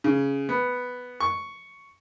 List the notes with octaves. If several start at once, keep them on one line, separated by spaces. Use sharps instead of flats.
C#3
B3
C#6